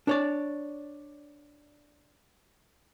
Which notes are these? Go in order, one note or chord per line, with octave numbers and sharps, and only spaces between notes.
D4 C#5 D5